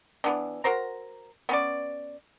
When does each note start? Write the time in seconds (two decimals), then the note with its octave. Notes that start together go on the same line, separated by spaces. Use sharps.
0.24 E3 B3 D4
0.64 F#4 A#4 C5 A#5
1.49 B3 C#4 D5